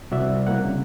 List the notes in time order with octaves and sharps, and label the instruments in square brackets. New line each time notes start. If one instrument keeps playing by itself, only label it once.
[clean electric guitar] C2 [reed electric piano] F#4 D5 E5
[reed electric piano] A#3 E4 F#5
C#3